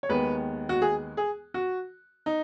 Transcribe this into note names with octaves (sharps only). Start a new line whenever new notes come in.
C#5
D#2 D#3 G#3 B3 B4
F#4
G#4
G#4
F#4
D#4